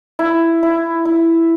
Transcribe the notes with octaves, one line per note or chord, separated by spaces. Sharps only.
E4
E4
E4